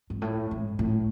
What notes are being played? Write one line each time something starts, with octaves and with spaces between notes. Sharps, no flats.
G#2
A2
G#2
A2